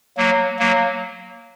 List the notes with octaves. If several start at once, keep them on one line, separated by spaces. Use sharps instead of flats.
F#3 A#3
F#3 A#3